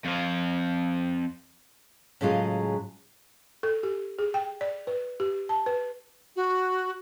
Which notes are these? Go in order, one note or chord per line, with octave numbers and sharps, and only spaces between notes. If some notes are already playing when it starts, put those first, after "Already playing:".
F2 F3
A2 C#3 F#3 G#3 F4 G#4
A4
G4
G#4
G5
D5
B4
G4
A5
B4
F#4